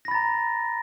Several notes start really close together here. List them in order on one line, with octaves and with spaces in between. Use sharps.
A#6 B5 A6 A#5